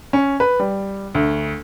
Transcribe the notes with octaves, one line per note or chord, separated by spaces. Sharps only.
C#4
B4
G3
D2